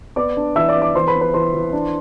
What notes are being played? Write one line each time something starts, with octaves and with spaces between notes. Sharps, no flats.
B3 D5 D6
D4
E3 E5 E6
D5 D6
B3
D5 D6
E3 C5 C6
B4 B5
B3
B4 B5
E3 C5 C6
E3
D4